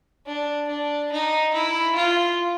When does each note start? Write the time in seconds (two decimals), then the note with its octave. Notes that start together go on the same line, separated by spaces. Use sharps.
0.26 D4
0.68 D4
1.12 D#4
1.54 E4
1.95 F4